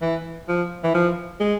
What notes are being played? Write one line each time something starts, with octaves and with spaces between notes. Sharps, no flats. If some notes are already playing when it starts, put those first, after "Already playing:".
E3
F3
E3
F3
G#3